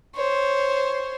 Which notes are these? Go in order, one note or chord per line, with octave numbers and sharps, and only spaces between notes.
C5 C#5